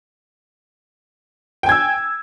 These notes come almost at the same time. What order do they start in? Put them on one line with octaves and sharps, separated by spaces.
G5 G#5 G#6 E6